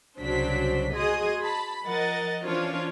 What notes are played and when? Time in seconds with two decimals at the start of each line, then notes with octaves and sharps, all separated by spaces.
0.19 C2 C#3 F#3 D4 C5 B6
0.95 F#4 G#4 D#5 G#5 C6 D#6
1.42 A5 B5
1.84 F3 A#4 D#5 F#5 A6
2.44 E3 C#4 D4 F4 C5 C#5